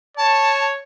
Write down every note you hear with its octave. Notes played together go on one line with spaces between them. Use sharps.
C#5 A5